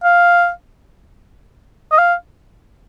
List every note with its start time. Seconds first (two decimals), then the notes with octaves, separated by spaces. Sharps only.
0.04 F5
1.92 D#5
1.98 F5